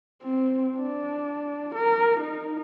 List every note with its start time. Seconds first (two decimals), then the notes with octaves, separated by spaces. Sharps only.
0.22 C4
0.78 D4
1.75 A#4
2.20 D#4